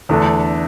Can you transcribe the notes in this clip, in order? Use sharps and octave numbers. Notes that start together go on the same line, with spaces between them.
E2 D3 A3 D4 A4